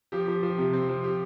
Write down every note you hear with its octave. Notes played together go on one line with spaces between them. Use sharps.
F3 G4
F3
F3
C3
C4
F3
G4